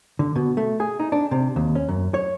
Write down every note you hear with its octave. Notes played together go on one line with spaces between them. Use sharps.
D3
B2
A3
G#4
D#4
D4
C3
D#2
C#4
F#2
C#5